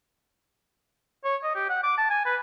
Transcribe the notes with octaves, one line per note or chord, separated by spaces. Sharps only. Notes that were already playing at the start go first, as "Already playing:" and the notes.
C#5
D#5
G4
F#5
D6
A5
G#5
B4